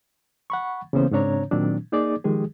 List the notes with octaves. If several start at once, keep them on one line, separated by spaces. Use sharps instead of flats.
F#5 B5 C#6
C#3 E3 A#3 B3 C#4 C5
G#2 C#3 C4 D4 C#5 A#5
A#2 D#3 F#3 C4 D4
A#3 D#4 G#4 D5 D6
D#3 F3 G#3 G4 G#4